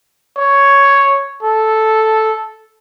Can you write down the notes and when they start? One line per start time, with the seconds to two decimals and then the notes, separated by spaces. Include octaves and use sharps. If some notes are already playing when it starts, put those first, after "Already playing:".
0.37 C#5
1.43 A4